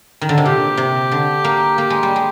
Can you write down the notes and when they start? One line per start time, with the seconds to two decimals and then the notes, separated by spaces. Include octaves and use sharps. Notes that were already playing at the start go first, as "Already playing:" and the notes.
0.21 D#3
0.29 D3
0.38 C3
0.45 A#2 G4
0.77 C3
1.11 D3
1.44 A#3
1.78 A#3
1.90 G#3
2.03 G3
2.16 G#3